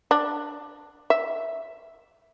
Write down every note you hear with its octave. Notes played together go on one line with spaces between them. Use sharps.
D4
E5